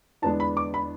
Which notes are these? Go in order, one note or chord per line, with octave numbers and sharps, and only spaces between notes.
E2 D3 G#3 B3 D4 A5
B5
D6
B5